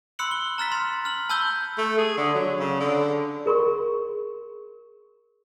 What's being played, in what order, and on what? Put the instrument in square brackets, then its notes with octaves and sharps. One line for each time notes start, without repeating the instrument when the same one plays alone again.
[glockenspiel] B5 C6 E6 F#6 C#7 F#7
G7
A#5 F6 A6 B6
C6 A6 F7
F6 F#7
A5 B5 E6 G6 G7
[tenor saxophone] A3
G#4
D3
F#3
C#3
D3
[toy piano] G#4 A#4 C6 C#6